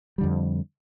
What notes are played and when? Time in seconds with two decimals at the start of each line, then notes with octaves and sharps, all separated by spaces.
0.18 G3
0.21 D3
0.23 F2